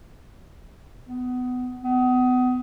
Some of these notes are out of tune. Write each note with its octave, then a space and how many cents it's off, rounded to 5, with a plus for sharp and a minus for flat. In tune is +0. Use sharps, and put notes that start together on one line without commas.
B3 +20
B3 +30